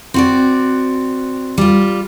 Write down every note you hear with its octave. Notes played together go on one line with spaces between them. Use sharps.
C4 F#4 D5
G3 F4